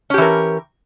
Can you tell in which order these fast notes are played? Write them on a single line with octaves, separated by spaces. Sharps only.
C#4 G4 E3 A#4